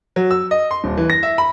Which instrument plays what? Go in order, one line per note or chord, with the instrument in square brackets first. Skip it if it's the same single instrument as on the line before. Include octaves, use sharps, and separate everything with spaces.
[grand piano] F#3
E6
D#5
C6
D#1
E3
A#6
E5
B5